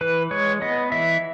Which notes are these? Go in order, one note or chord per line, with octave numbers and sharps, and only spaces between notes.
E3 B4
G#3 C#5
B3 D#5
E3 E5